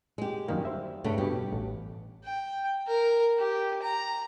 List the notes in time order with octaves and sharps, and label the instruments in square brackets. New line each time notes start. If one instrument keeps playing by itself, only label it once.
[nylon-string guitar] G#3 G4
[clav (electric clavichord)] F#2 D#3 A#3 [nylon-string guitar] G3
[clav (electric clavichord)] C5 E5
[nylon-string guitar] G2 C#3 A3
[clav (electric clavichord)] G2 B2 [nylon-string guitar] G4
[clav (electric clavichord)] A1
[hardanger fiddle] G5
A#4
G4
A#5